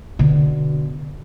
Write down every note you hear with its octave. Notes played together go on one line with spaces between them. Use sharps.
B2 D3